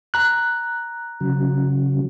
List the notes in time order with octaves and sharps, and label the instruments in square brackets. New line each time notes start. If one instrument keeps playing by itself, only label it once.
[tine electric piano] A#5 F#6
[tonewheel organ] C#3 F#3